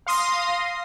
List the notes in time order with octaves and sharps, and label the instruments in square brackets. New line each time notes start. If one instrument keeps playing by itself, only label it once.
[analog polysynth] F5 C6 D#6 A#6